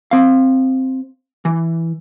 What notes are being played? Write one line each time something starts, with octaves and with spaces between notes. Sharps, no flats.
C4 F5
E3